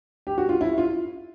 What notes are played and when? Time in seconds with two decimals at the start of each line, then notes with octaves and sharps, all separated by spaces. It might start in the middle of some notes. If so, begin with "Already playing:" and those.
0.27 G4
0.38 F#4
0.49 F4
0.61 E4
0.78 F4